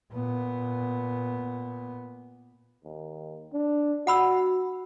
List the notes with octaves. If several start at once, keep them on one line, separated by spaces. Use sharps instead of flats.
A#2 B3
D#2
D4
F#4 F#5 B5 E6